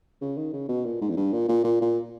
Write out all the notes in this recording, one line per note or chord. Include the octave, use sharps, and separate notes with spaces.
C#3
D#3
C#3
B2
A#2
G#2
E2
G2
A#2
A#2
A#2
A#2